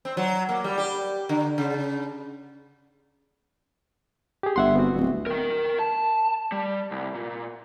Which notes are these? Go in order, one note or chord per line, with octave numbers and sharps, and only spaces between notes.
C4
F#3
A#3
G3
G4
D3
C#3
G4 G#4
G1 E5 F#5 C6
B3 C4 F#4
D1
A#4 G5
A5
G3
C2
A#2